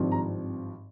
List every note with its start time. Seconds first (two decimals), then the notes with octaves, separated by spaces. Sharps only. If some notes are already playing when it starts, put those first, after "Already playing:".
Already playing: G#1 G2 F3 C4
0.12 A#5